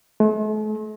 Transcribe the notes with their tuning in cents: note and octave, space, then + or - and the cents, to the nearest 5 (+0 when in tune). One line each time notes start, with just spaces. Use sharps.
A3 -45